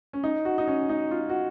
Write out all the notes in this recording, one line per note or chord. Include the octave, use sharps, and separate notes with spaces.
C#4
D#4
F#4
D#4
C#4
D#4
F4
F#4